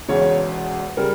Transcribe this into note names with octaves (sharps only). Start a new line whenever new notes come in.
E1 E2 C#3 C#5
C#3 G3 A#4